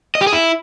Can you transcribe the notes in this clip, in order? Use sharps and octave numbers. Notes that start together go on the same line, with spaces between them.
D#5
G4
G#4
E4